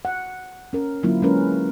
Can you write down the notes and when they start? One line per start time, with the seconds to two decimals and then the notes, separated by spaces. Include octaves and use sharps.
0.05 F#5
0.73 C#4 A#4
1.03 D3 F#3 A#3 C4 E4 F4
1.22 G#3 A#3 C#4 A#4 B4